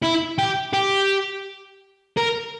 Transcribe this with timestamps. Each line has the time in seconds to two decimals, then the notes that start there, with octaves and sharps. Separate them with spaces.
0.02 E4
0.38 G4
0.73 G4
2.17 A#4